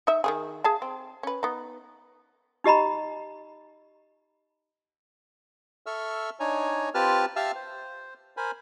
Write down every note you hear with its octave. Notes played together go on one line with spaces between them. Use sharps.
D#4 E5
D#3 E3 G#4
G#4 F5 A5
C4
C#4 B4
B3 D#4
D#4 G4 D#5 A#5 B5
A4 E5 C#6 E6 F6
D4 D#4 C#5 G#5 A#5
C4 F4 G4 B4 A5 F6
G4 E5 F5 A5 E6 F6
C5
A#4 C5 G#5 B5